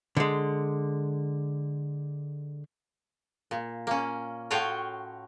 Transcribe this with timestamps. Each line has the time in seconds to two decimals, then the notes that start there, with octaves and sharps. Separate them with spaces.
0.17 D3 G#3
3.51 A#2
3.87 A#3 C#4
4.51 A2 F4 F#4 C#5 F5 G5